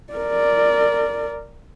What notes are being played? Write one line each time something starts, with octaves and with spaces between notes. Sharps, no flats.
A#4 D5